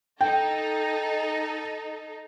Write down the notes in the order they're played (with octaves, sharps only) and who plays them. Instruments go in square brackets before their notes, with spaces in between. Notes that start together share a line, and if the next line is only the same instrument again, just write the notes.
[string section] D#4 A4 [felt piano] G5